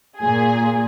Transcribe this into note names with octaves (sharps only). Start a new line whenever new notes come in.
A#2 G#4